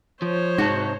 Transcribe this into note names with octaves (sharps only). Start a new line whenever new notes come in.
F3 C5 C#5
G#2 C3 D#4 F#4 A5